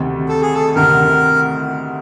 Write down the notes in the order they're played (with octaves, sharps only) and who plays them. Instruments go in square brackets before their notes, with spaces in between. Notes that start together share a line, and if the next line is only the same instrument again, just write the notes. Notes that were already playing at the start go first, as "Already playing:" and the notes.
Already playing: [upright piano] D2 C3 D#3
[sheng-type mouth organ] A4
G#4
A4
[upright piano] D2 C3 D#3 [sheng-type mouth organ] A#4